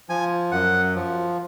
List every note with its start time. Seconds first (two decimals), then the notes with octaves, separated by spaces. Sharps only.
0.09 F3 G#5
0.52 F#2 F#5
0.95 F3